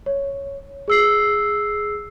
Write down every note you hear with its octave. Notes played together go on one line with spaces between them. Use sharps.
C#5
G#4 E6 C7